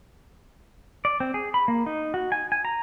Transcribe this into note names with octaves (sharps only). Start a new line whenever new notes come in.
D5
C4
G#4
B5
A#3
D#4
F#4
G#5
G#5
A#5